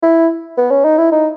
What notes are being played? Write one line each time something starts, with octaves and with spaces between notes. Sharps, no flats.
E4
B3
C#4
D#4
E4
D#4